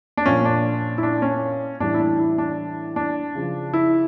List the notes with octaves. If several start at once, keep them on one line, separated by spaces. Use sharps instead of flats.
D4
A#2 F3 C#4
D4
E4
D4
C#4
A2 E3 G3 D4
E4
D4
E4
D4
D4
C#3 F3
E4